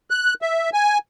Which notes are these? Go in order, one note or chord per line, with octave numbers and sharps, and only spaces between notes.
F#6
E5
G#5